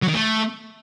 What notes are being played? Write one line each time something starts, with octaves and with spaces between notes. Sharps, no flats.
F#3
D#3
A3